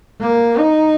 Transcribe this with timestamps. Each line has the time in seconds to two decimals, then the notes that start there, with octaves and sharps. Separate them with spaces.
0.21 A#3
0.59 D#4